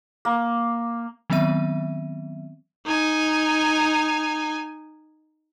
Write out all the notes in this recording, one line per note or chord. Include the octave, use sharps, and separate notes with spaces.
A#3
D#3 F#3 B3 C4 E5 D#7
D#4 G#5